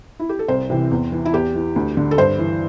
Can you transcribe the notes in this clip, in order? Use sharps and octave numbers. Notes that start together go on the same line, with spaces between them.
E4
G4
A4
C2 C5
C3 E3
E2
E3
E4
E2 G4
E3
D2
D3
A4
G2 C5
E3